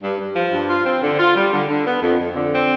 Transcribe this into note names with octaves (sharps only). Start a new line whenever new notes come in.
G2
G2
F3
G2
F4
C4
D3
F4
G3
D3
D3
B3
F2
F2
D3
C4